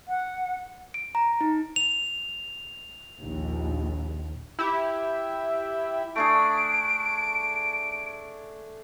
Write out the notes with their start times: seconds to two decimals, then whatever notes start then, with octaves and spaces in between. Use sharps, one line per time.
0.08 F#5
0.94 D7
1.15 A#5
1.41 D#4
1.76 F7
3.20 A#1 D#2
4.59 E4 G4
6.16 A3 D4 G#4 D7